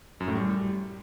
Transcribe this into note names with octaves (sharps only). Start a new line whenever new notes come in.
F#2
A2
G3